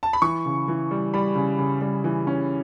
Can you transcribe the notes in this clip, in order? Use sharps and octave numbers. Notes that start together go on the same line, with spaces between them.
A5
B5
E3 C#6
C#3
E3
G3
G3 B5
C#3
C#3
G3
E3
C#4